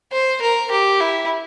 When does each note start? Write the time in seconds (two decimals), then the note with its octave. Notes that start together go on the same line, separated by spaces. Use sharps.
0.12 C5
0.42 A#4
0.71 G4
1.00 E4